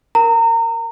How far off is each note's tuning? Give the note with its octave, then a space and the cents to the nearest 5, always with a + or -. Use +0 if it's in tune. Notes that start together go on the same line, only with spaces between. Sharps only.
A#4 +0 A#5 -30